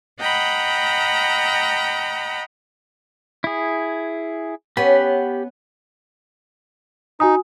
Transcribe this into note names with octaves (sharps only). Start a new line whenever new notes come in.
D#5 F#5 G5 A#5 B5
E4 G#4
B3 C#4 G4 B5
D#4 F#4 G#5 D#6